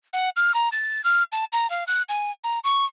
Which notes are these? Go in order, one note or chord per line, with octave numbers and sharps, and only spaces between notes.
F#5
F6
A#5
A6
F6
A5
A#5
F5
F#6
G#5
A#5
C#6